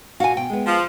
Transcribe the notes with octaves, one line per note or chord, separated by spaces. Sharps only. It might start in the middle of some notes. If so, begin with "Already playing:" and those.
A#2 F#4 F5 G#5
B2 G5
G#3 B3
F3